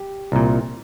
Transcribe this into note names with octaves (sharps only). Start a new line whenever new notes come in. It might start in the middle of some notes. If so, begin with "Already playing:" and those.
Already playing: G4
C2 A#2